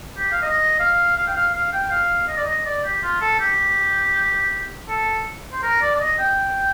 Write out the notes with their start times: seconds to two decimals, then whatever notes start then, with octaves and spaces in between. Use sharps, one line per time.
0.17 G4
0.32 F5
0.42 D#5
0.79 F5
1.17 F5
1.27 G5
1.35 F5
1.54 F5
1.72 G5
1.91 F5
2.28 D#5
2.36 D5
2.45 D#5
2.65 D5
2.84 G4
3.03 F4
3.21 A4
3.40 G4
4.88 A4
5.52 C5
5.63 A#4
5.81 D5
5.95 D5
6.00 D#5
6.18 G5